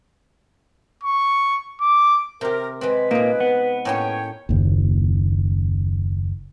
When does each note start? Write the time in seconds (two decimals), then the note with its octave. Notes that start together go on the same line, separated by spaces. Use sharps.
1.03 C#6
1.81 D6
2.41 C3 G4 A#4
2.81 G#3 C4 B4
3.11 A#2 A#3 D#4 G#4
3.40 B3
3.85 A2 A#3 C#4 C#5 G5
4.49 F#1 D#2